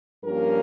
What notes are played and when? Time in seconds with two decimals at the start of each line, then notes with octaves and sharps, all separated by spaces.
0.24 G2 F3 A#3 C#4 G4 A#4